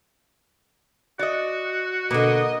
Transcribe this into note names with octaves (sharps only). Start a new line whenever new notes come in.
F#4 D5 D#5
B2 D3 A#3 D#5